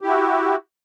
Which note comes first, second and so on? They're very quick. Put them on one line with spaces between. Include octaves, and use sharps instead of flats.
G4 E4 F#4